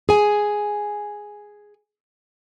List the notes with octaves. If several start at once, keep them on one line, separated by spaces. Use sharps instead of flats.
G#4 G#5